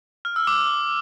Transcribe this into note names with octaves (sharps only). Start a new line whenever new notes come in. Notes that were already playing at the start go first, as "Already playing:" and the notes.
F6
E6
D6